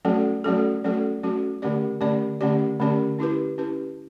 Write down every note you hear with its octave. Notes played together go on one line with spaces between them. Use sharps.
F#3 A3 C#4 F#4 A4
F#3 A3 C#4 F#4 A4
F#3 A3 C#4 F#4 A4
F#3 A3 C#4 F#4 A4
D3 A3 C#4 G4 D5
D3 A3 C#4 G4 D5
D3 A3 C#4 G4 D5
D3 A3 C#4 G4 D5
C#4 E4 G4 B4
C#4 E4 G4 B4